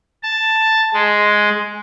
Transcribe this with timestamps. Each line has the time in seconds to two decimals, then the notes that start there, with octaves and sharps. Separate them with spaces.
0.23 A5
0.94 G#3